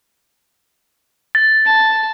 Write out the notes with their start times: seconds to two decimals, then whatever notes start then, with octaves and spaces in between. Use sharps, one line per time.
1.35 A6
1.66 A5